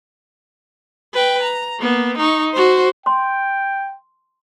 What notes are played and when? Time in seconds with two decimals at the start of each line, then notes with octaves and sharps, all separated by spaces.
1.13 B4 G5
1.43 A#5
1.80 A#3 B3
2.18 D#4 C#6
2.53 F#4 C5
3.06 G5 C6